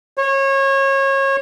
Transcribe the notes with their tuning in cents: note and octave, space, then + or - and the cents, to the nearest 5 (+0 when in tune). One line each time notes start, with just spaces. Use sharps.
C#5 -30